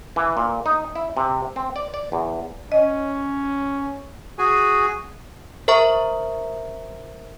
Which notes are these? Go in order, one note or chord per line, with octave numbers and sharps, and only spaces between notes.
E3
A#2
D#4
E4
C3
C4
D5
D5
E2
C#4 D#5
F#4 G#4 G#5
A#4 C5 E5 A#5 C#6